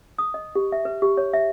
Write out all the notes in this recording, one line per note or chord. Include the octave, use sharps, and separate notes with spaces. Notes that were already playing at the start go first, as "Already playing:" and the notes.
D#6
D#5
G4
E5
B4
G4
C#5
E5